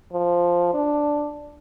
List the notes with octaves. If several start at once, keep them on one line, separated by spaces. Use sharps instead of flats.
F3
D4